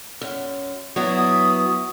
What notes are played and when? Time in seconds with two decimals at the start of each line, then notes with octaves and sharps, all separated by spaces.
0.21 F#2
0.96 F#3 B3 E4 D#6